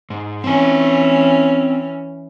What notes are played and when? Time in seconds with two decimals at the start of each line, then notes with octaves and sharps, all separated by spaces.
0.10 G#2
0.44 E3 C4 C#4 G#5